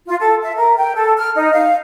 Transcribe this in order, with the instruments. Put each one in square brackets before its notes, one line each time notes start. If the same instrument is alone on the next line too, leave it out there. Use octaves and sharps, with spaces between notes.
[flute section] F4
A4
E5
A#4
G5
A4
F6
D#4
F5